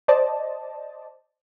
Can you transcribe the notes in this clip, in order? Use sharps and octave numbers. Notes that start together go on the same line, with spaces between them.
C5 D5 D#5 A5